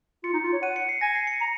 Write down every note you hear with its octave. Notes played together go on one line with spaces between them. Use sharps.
F4 C#7
D#4
F4
C#5
F#5 D#7
C#7
C7
G#5 A#6
C7
C#7
A#5